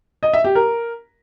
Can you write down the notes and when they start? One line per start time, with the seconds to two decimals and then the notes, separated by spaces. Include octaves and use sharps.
0.23 D#5
0.34 E5
0.44 G4
0.55 A#4